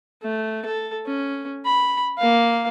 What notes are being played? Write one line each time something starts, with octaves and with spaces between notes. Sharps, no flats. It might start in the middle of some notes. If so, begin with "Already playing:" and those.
A3
A4
C#4
B5
A#3 F5